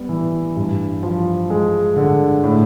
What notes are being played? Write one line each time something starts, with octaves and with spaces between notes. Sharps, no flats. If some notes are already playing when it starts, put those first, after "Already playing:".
Already playing: G3 B3
E3
G2
F3
G#3
D3
A2